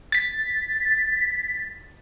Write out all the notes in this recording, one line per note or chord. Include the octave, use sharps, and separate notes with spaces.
A6 B6